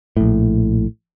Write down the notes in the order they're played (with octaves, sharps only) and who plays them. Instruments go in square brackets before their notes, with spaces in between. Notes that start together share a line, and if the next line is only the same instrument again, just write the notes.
[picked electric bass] A#1 A2